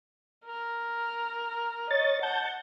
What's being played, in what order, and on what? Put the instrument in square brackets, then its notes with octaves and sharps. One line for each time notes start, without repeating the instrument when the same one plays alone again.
[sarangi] A#4
[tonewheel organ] C#5 A6 [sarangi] D#5
[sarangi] F#5 [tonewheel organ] A5 G6